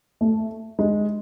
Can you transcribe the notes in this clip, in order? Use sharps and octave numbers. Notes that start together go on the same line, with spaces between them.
A3
G#3